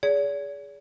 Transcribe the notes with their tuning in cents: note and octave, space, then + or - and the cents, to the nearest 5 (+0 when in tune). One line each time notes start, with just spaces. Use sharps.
G#4 +0 D5 -45